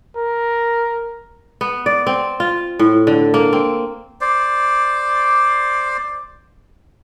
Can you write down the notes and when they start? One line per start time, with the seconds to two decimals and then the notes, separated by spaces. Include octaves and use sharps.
0.17 A#4
1.61 B3
1.86 D5
2.07 C4
2.40 F4
2.79 A2
3.07 D3
3.34 A#3
3.53 C4
4.21 C5 D5